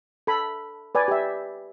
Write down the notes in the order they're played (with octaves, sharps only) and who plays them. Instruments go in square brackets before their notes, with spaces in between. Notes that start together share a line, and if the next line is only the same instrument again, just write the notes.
[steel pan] A4 B5
B4 D5 G#5
G4 E5